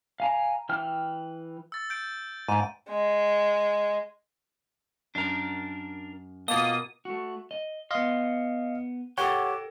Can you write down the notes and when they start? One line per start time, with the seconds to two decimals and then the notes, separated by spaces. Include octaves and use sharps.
0.20 F5 G#5 A#5
0.69 E3 G5 F6
1.72 E6 A6
1.90 G6 D7
2.48 G#2 D#7
2.89 G#3
5.15 F#2 D4 A#4
6.48 B2 A#3 B3 F4 D#5 A5 D#6
7.05 A3 F#4
7.51 D#5
7.91 B3 D#5 F5 C6
9.18 G4 A4 A#4 C#5 F#5 G5